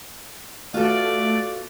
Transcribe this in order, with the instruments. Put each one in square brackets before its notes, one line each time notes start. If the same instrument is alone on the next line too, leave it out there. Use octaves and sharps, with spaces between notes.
[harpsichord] B2 D6 [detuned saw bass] A3 [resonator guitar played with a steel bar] F4 A4 [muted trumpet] D5